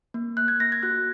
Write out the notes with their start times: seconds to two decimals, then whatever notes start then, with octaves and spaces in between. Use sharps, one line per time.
0.14 A#3
0.37 A#3 F#6
0.48 G#6
0.60 A#3 A#6
0.72 G#6
0.83 F#4 F#6